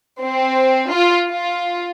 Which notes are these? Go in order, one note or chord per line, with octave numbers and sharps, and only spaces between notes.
C4
F4
F4